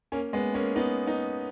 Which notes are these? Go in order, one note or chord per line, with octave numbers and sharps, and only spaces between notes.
A#3 C#4
G#3 B3
A#3 C#4
B3 D#4
B3 D#4